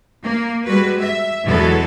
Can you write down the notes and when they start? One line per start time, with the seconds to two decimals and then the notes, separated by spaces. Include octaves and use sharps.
0.23 A#3
0.66 G3 G#3 F#4 B4
0.98 E5
1.43 E2 B2 F#3 G#3 B3 A4